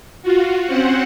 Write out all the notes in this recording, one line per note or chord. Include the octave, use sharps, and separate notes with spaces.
F4 F#4
C4 C#4 C5 F#5